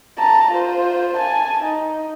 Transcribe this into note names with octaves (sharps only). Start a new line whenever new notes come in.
A5 A#5
F4 C5
G#5 A5
D#4